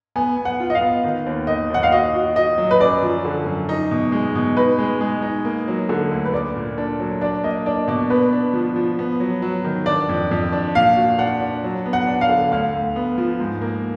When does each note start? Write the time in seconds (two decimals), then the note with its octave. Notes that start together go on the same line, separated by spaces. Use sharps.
0.16 B3 G#5
0.37 B3
0.45 F#5
0.60 F4
0.70 D#5
0.75 F5
0.81 B3
1.04 D#3
1.26 D#2
1.47 D#3 D#5
1.70 D#2 F#5
1.83 F5
1.92 F#4 D#5
2.14 F#4
2.36 F#4 D#5
2.58 F#3
2.71 B4
2.81 F#2 D5
3.02 F3
3.25 D3
3.46 F#2
3.69 D#4
3.91 B2
4.12 G#3
4.35 B2
4.57 D#4 B4
4.78 G#3
5.01 G#3
5.22 D#4
5.45 A#3
5.68 F#3
5.89 D3
6.11 D2
6.25 B4
6.33 A#3 D5
6.55 A#2
6.78 D4
7.00 F#3
7.21 D4 D5
7.44 A#3 D#5
7.66 D4 D5
7.88 B2 D5
8.10 B3 B4
8.32 D4
8.53 F3
8.76 F3
8.99 B3
9.20 F#3
9.42 F#3
9.64 D#3
9.86 D4 D5
10.09 F2
10.31 F2
10.52 D4
10.75 A#2 F5
10.97 F#4
11.18 D4 F#5
11.41 D4
11.64 F#3
11.86 B3
11.93 F#5
12.07 D4
12.21 F5
12.29 D3
12.51 D2 F5
12.74 D2
12.96 B3
13.18 F3
13.40 G#2
13.61 A#3